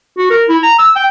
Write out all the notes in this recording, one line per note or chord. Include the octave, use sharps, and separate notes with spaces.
F#4
A#4
E4
A#5
E6
G5